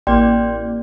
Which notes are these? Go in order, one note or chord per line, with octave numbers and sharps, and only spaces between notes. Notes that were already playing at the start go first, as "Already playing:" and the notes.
A1 A#3 D5 G5 C6